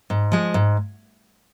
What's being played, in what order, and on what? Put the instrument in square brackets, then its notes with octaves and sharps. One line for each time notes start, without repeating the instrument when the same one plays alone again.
[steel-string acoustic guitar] G#2
F3 G#3
G#2